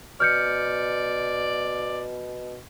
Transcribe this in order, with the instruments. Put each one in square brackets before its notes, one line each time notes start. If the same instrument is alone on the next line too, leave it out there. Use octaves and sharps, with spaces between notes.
[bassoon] B2 [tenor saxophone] D5 [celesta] F6 G6 C#7